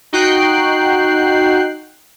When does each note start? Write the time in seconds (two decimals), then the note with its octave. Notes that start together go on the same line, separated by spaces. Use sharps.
0.13 D#4 F#4 G5 F#6 C7